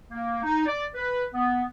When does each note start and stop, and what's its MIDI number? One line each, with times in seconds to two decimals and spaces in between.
0.10 0.39 58
0.43 0.64 63
0.66 0.84 74
0.95 1.25 71
1.34 1.64 59